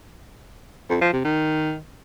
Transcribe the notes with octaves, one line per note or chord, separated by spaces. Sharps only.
F2
F3
C3
D#3